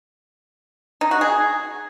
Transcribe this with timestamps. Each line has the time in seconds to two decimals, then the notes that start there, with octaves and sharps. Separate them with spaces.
1.01 D#4
1.11 F#4
1.21 G#4